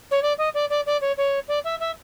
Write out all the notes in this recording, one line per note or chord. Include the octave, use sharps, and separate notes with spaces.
C#5
D5
D#5
D5
D5
D5
C#5
C#5
D5
E5
E5